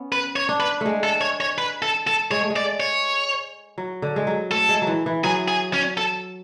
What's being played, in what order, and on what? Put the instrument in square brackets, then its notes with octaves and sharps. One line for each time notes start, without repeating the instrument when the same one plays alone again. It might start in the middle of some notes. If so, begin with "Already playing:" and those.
Already playing: [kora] B3 C#4
[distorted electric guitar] B4
C#5
[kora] D4
[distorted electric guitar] B4
[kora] G#3 A3
[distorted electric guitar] A4
C#5
C#5
B4
A4
A4
[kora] G#3 [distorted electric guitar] C#5
[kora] A3
G#3
[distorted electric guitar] D5
C#5
[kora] F#3
D3
G#3
F#3
[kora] A3 [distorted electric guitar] A4
[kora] G#3
F#3
E3
E3
[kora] F#3 [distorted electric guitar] G#4
[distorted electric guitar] G#4
C#4
A4